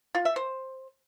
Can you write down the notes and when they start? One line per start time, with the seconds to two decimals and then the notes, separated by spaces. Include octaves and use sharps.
0.15 F4
0.25 E5
0.36 C5